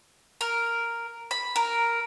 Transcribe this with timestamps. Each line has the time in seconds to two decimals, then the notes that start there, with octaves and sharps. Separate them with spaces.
0.41 A#4
1.31 B5
1.56 A#4